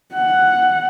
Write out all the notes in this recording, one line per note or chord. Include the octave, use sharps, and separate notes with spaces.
F#5